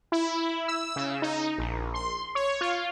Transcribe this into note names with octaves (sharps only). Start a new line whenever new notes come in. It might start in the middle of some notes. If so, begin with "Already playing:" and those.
E4
E6
C#3
D#4
A#1
C6
C#5
F4